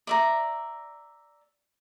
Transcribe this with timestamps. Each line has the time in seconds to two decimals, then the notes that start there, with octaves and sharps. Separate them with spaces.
0.07 D5 E5 A#5